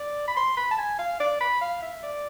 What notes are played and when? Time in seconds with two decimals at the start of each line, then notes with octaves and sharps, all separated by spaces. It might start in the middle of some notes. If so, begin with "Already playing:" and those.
Already playing: D5
0.27 B5
0.36 C6
0.57 B5
0.71 A5
0.78 G#5
0.99 F5
1.19 D5
1.40 B5
1.61 F5
1.82 E5
2.03 D5